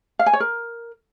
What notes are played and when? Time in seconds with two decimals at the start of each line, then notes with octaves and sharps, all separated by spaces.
0.19 F5
0.26 G#5
0.33 C#5
0.40 A#4